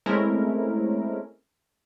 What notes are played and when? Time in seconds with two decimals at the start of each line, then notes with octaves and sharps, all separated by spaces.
0.06 G#3 A3 C4 C#4 E4 A#4